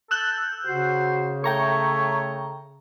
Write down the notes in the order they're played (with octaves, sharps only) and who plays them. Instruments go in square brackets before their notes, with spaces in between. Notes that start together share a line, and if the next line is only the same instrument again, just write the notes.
[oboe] A4 [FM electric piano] E6 F#6 G6
[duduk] C#3 [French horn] F#4 [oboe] C5
[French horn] A3 [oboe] C#5 [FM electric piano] G5 A#5 C#6